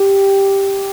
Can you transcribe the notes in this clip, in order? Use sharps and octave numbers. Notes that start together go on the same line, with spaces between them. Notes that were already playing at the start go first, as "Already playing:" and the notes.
Already playing: G4